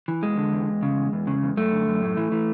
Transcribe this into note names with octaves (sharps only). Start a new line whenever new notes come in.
E3
E2 G#3
D3
E2
E2
C#3
E2
E2
C#3
E2
F#2 A3
D3
F#2
A2
E3
E3